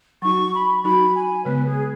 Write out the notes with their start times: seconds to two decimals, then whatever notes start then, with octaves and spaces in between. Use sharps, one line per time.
0.22 F#3 D#4 F#4 C#6
0.53 B5
0.84 F#3 D#4 F#4 B5
1.15 G#5
1.45 C#3 G#3 B3 B4
1.67 G#4